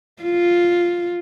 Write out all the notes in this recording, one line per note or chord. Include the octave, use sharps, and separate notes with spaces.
F4